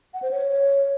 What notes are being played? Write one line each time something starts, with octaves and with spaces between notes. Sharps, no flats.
F#5
C5
C#5